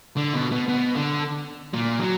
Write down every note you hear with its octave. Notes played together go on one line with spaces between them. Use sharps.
D3
B2
B2
B2
D3
A#2
F#3